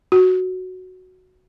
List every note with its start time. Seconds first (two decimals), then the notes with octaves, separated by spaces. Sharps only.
0.12 F#4